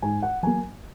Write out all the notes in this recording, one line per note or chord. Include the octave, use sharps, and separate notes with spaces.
G#2 G#5
F#5
F#3 A#3 G#5